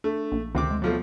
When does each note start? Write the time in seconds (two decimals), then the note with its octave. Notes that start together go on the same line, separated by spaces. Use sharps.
0.04 A3 D4
0.32 A#1
0.55 D2 C3 D#3 C4 D6
0.70 G#3
0.82 B2 F3 F#3 A3